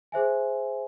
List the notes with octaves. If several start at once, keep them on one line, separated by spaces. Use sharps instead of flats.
G#4 C5 E5 G#5